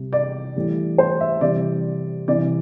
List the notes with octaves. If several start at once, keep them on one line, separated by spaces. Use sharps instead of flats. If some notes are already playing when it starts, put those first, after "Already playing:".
Already playing: C3 G3
D5
A2 E3 G3
C5
E5
C3 E3 G3 D5
C3 E3 G3 D5